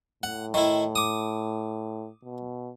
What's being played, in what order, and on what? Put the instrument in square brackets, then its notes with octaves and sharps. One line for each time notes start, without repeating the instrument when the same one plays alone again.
[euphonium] A2 [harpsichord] F#5
[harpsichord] D#3 E4
D6 D#6
[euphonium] B2